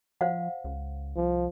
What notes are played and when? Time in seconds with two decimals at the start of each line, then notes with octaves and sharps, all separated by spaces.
0.21 F3 C5 F5 F#5
0.64 C#2
1.17 C2 F3